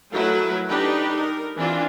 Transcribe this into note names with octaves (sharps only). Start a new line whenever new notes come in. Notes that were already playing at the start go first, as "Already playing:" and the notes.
F#3 A3 E4 A#4 B4
D4 D#4 G4 B4
A#4
E3 C4 D4 E4 F4